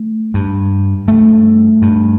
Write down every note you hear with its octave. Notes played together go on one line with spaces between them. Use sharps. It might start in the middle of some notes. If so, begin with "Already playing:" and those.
Already playing: A3
G2
G2 A3
G2